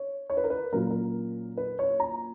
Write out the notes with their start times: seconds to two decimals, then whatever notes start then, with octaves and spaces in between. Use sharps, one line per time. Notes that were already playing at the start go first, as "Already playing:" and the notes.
Already playing: C#5
0.30 C#5
0.37 B4
0.44 A#4
0.50 B4
0.73 A#2 F#3 A#3 C#4 A#4
0.91 A#4
1.57 B4
1.79 C#5
2.00 A#5